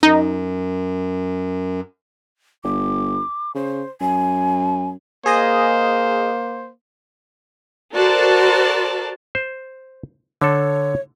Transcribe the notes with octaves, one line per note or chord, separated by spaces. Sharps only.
F#2 D#4
G1 D6
C#3 C5
F#2 G#5
A#3 G#4 C5 D#5 D#6
F#4 A4 A#4 C5 D5 A5
C5
D3 A4 C#5